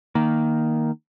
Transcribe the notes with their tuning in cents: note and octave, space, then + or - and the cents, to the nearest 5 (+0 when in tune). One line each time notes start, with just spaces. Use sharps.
D#3 +0 A#3 +0